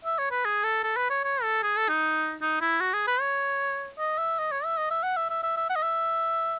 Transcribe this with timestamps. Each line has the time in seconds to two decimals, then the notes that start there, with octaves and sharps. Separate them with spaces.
0.05 E5
0.18 C#5
0.31 B4
0.45 G#4
0.64 A4
0.83 A4
0.96 B4
1.10 C#5
1.24 C#5
1.43 A4
1.63 G#4
1.76 A4
1.89 D#4
2.42 D#4
2.61 E4
2.80 F#4
2.94 G#4
3.07 B4
3.20 C#5
3.99 D#5
4.18 E5
4.39 D#5
4.51 C#5
4.65 E5
4.77 D#5
4.91 E5
5.03 F#5
5.17 E5
5.30 E5
5.43 E5
5.57 E5
5.69 F#5
5.76 D#5
5.83 E5